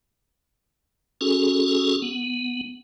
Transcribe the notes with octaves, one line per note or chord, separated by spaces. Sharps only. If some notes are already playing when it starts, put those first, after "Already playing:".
C#4 F#4 G#4 A4
B3